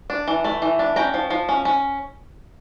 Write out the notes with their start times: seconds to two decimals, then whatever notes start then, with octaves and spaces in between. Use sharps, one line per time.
0.10 D4
0.28 E3
0.44 A3
0.62 E3
0.79 D4
0.96 C#4 G5 A#5
1.14 F3
1.30 F3
1.49 C#4
1.65 C#4